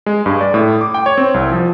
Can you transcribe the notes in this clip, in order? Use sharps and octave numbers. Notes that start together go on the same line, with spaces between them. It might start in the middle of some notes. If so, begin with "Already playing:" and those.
G#3
G2
D5
A2
D6
G5
C#5
C4
C2
F3